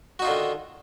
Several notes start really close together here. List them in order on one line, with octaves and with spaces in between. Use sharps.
F#4 D#4 F4 D3 D#3